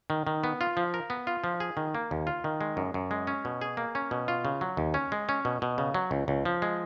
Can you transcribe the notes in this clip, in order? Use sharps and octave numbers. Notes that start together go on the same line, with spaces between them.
D#3
D#3
B3
F4
F3
A#4
B3
F4
F3
G#4
D#3
A#3
D#2
F4
D#3
G#3
F#2
F#2
G#3
C#4
B2
G#4
A#3
C#4
B2
F4
C#3
F#3
D#2
C#4
G#3
C#4
B2
B2
C#3
F#3
C#2
C#2
F3
G#3